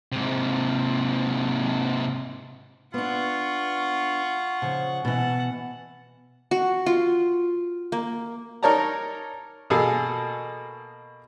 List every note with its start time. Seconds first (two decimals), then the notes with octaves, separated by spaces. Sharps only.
0.12 G#2 C3
2.94 B3 D4 F4 F#5 C#6
4.62 C#3 F3
5.05 B2 E3 F#5 A5
6.51 F#4
6.86 F4
7.92 A#3
8.63 D#4 A#4 C#5 D5 A5 A#5
9.70 B2 A#3 G#4 A4